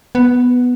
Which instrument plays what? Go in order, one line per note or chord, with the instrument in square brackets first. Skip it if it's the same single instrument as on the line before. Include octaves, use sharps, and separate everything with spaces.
[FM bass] B3